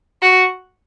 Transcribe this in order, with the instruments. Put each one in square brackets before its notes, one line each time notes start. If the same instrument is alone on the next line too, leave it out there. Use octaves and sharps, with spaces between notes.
[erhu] F#4